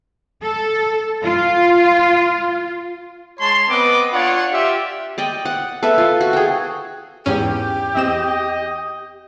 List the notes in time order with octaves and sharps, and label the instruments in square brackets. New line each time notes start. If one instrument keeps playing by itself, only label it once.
[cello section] A4
F4
[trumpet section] G#3 C#5 A5 C6
B3 C4 B4 D#5 D6
D4 F4 C#5 D5 F#5
F4 G4 E5
[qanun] D5 D#5 G5
F#5
A4 B4 E5
F4
F#4
G#4 G5
[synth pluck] E2 G#2 C#4 [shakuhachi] G4
[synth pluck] E2 C4 E7 [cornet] D#5